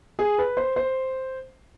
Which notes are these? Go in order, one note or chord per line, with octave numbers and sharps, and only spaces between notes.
G#4
B4
C5
C5